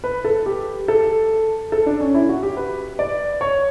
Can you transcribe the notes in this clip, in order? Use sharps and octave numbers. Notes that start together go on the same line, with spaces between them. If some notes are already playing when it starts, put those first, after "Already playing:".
B4
A4
G4
A4
A4
D4
C#4
E4
F#4
G4
B4
D5
C#5